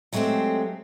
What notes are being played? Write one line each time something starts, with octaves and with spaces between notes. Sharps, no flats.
F#3 G#3 A3 B3 C4 G4